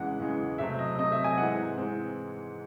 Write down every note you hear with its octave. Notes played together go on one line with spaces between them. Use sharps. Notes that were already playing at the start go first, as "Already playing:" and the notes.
Already playing: E2 C#3 E3 G#3 F#5
E2 C#3 E3 G#3
C3 F#3 A3 C4 E5
D#5
C3 F#3 A3 C4 D#5
E5
G#5
G#2 E3 G#3 C4 F#5
E3 G#3 C4